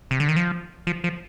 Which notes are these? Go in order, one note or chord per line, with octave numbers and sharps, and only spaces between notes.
C3
D3
D#3
F3
F3
F3